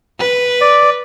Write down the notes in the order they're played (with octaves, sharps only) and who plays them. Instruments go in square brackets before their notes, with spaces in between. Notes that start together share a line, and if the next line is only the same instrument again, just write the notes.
[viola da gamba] B4
[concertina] D5